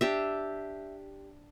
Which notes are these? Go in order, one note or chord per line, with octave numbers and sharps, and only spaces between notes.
D4 G4 E5